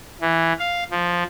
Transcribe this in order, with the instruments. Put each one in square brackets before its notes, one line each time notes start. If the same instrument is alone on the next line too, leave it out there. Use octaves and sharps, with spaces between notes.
[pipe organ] E3
F5
F3